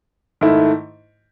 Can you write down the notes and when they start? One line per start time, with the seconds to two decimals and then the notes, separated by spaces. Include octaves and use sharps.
0.41 G#2 D#3 A3 E4